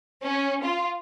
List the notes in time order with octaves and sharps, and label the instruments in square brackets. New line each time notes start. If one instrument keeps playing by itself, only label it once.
[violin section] C#4
F4